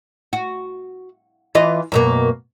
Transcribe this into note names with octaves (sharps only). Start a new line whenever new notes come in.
F#4
E3 F4 D#5
F#2 B2 A#3